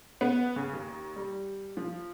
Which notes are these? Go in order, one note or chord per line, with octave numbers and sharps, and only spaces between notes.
B3
C#3
D#2
G3
F3